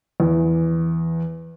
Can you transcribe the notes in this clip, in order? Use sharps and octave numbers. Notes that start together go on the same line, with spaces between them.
E2